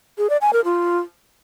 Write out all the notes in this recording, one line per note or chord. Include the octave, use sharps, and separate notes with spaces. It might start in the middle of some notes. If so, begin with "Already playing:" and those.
G#4
D5
G#5
A#4
F4